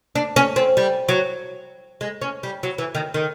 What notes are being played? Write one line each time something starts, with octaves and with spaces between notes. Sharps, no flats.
D4
C#4
C4
G3
F#3
G#3
C#4
G3
F#3
E3
D#3
D#3